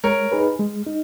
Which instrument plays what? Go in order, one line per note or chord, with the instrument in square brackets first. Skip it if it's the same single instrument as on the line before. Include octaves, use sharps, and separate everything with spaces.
[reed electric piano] G#3 [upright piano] A#4 C#5
[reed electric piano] D#4 G#4 B4
G#3
D#4